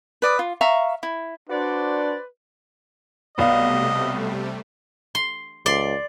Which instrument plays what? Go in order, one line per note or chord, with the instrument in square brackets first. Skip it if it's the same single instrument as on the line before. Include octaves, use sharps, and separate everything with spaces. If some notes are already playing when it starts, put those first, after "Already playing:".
[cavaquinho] B4 D5 D#6
F4
E5 F5 A#5 C#6
E4
[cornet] D4 [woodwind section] F#4 C5 D5 [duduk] B4
[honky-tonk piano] B1 B3 [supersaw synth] C3 G3 A3 [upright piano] D5 F5 [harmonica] D#5
[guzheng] C6
[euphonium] C#2 [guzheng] D5 C6